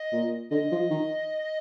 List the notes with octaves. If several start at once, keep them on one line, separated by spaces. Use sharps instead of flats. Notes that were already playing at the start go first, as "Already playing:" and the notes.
Already playing: D#5
A#2
D3 D#5
F3
D#3